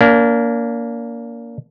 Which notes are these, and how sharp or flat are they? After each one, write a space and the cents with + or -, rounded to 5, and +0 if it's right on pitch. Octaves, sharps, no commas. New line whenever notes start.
A#3 +0 D4 -35